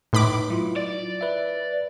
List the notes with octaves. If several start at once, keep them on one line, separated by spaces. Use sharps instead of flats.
A2 D#4 B4 B5 C6 D6
F#3 E4 F4
D5
B4 E5